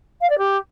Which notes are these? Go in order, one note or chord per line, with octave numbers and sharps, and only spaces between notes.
F5
D5
G4